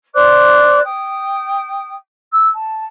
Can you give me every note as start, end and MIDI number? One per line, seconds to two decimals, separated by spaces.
0.13 0.79 72
0.13 0.79 74
0.13 0.79 86
0.13 0.79 90
0.82 1.94 79
0.82 1.94 87
2.32 2.47 88
2.52 2.83 81